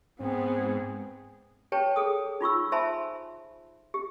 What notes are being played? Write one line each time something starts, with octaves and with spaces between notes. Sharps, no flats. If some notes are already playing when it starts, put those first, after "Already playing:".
G#2 B3 C4 G#4
G4 B4 C#5 G5 A5
G#4 A4 D#6
D#4 F4 C#6 E6
C5 E5 G#5 A5 B5 C6
G4